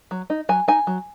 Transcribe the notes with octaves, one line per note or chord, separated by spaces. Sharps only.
F#3
D#4
F#3 G#5
D#4 G#5
F#3